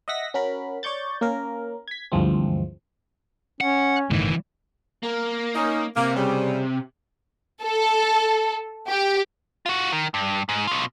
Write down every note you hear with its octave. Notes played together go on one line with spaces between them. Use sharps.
D#5 E5 F#5 A#6 B6
C#4 F#4 A#4 B5
C#5 D5 C#6 G6 A6
A#3 C#4 A#4
G#6 B6
D2 G2 E3 F3 G#3 C4
C#4 F#5
G1 C2 A2 D#3 E3
A#3
C#4 D#4
C3 A#3
C#3 G3
A4
G4
F4 F#4
D#3
G2
G#2
B2 F4